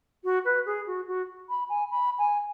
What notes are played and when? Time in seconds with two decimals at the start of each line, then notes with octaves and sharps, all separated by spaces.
0.24 F#4
0.44 B4
0.66 G#4
0.86 F#4
1.07 F#4
1.49 B5
1.69 G#5
1.90 B5
2.18 G#5